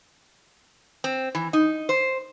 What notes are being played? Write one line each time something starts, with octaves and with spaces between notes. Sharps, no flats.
C4
E3
D#4
C5